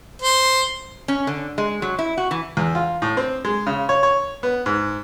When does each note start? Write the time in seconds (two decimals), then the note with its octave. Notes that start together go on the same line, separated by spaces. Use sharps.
0.22 C5
1.08 C#4
1.27 D3
1.58 G#3
1.82 F#3
1.99 E4
2.18 F#4
2.31 E3
2.57 E2
2.75 F4
3.02 A2
3.17 C4
3.45 G#3
3.67 C#3
3.89 C#5
4.03 C#5
4.43 B3
4.66 G#2